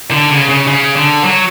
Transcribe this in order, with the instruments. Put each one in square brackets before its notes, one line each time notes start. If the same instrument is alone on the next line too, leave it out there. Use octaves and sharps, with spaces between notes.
[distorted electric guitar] D3
C#3
C#3
C#3
D3
F#3